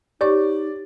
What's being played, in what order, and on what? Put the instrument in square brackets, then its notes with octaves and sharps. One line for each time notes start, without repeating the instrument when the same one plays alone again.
[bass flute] D#4 [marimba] G4 C#5 C#6 [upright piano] D5